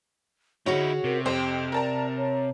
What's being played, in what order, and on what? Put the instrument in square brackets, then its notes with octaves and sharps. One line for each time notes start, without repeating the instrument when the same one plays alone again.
[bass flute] D3 [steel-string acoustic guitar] C#4 F#4 G#4 [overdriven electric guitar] D#4 E4 [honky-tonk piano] C#5
[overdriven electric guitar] C3 [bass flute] A#4
[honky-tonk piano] F2 C5 [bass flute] G4 [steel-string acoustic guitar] G5
[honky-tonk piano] A#4 A5 A#5 [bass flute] D5
[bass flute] C#5